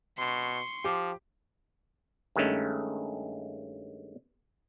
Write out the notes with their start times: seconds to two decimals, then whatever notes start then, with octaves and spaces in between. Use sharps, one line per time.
0.18 B2 C6 C#6
0.84 F3 G4
2.36 G2 D#3 G#3 A3 C#4